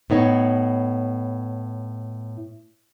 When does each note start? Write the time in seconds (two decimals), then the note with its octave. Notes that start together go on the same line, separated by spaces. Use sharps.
0.10 A2 B3 D#4 C#5